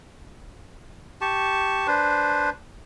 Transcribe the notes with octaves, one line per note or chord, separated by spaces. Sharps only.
G4 A5 C#6
D4 B4 C5